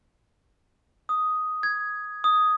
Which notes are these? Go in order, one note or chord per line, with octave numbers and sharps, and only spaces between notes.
D#6
G#6
D#6